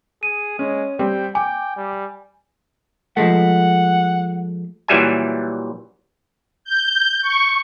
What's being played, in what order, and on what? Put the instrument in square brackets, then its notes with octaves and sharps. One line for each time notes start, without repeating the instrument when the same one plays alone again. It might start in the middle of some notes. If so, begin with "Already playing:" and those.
[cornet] G#4 [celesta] D#7
[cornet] G#3 [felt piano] C#4
[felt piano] G3 C4 [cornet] G5
[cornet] G5 [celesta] G#5 [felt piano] D6
[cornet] G3
[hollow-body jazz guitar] F3 G#3 A3 [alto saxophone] F#5
[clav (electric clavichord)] A#2 E3 F#3 G3 E5 G#5
[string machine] G6
C#6